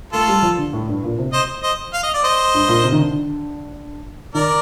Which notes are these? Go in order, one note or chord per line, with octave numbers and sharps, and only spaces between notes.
A3 F4 A4
G3
F3
D3
A2
G2
A#2
C3
C5 D#5
C5 D#5
F5
D#5
D5
C5 D#5
G2
A#2
C3
D#3
D3
D#3 A#4 D5